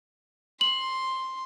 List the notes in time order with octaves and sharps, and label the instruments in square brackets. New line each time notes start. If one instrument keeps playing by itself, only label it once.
[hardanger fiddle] C6 [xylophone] F#7